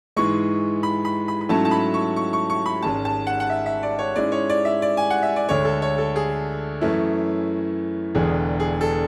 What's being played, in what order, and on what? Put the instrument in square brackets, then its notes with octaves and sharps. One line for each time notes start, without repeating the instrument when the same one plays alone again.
[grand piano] G#2 E3 G#3 [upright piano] C#6
[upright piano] B5
B5
B5
B5
[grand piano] G#2 F#3 A3 C#4 E4 [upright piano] A5
[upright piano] A5
B5
C#6
C#6
C#6
C#6
B5
[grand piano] G#1 G#2 G#3 C#4 [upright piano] A5
[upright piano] A5
F#5
F#5
E5
E5
D5
C#5
[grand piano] G#2 G#3 C#4 E4 [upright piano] D5
[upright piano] C#5
D5
E5
D5
G#5
F#5
E5
D5
[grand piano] D2 D3 G#3 [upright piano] C#5
[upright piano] A4
C#5
A4
G#4
[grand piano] F#2 E3 A3 C#4 E4
[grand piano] E1 E2 D3 [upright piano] G#4
[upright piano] G#4
A4